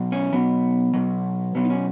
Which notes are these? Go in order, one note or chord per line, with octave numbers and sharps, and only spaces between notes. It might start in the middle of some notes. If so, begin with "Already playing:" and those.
Already playing: B2 F#3
C#4
B2 F#3 B3
B2 F#3
B2 F#3 B3
D#4
C#4